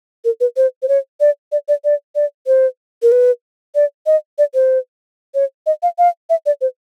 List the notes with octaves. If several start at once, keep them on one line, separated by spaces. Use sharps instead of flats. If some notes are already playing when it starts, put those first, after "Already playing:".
A#4
B4
C5
C5
C#5
D5
D5
D5
D5
D5
C5
A#4
B4
D5
D#5
D5
C5
C#5
D#5
F5
F5
E5
D5
C5